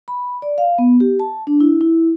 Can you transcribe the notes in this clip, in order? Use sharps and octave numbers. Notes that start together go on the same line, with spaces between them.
B5
D5
F5
B3
G4
A5
D4
E4
E4